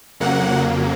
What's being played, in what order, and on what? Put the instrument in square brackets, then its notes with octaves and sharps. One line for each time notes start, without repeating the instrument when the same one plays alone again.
[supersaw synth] F2 C#3 F#3 A#3 F#5